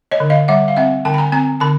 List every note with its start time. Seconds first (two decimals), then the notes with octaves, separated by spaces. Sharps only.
0.12 C#5 D#5
0.20 D3
0.30 D#5 F5
0.48 G3 E5 F#5
0.68 F5
0.77 C4 E5 F#5
1.05 D3 G5 A5
1.14 B5
1.18 G#5 A#5
1.32 C4 G#5 A#5
1.60 D3 A5 B5